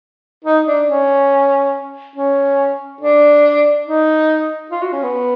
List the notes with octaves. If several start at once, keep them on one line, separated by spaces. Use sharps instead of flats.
D#4
D4
C#4
C#4
D4
D#4
F4
F#4
C#4
B3